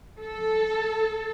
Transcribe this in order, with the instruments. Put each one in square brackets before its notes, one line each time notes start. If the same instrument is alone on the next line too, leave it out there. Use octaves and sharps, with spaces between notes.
[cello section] A4